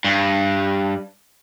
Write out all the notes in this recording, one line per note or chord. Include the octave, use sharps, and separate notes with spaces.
G2